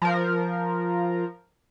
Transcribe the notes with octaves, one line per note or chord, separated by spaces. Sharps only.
F3 A#4